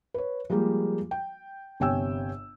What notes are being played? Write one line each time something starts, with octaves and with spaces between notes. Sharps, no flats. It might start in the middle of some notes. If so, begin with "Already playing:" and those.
B4 C#5
F3 G3 G#3 A#3 G4
G5
G1 C3 C#5 G5 G#5 E6